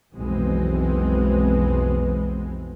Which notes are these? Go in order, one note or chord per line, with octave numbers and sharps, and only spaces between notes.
B1 F2 E3 G#3 B3 C4